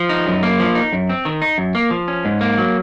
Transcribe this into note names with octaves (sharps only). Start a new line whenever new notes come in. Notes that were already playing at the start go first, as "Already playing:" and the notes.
Already playing: F3
D#4
F#2
A#3
F3
D#4
F#2
C4
D#3
D#4
F#2
A#3
F3
C#4
G#2
A#3
F#3